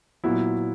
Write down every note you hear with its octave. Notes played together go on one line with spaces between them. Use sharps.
A#2 F#3 B3 E4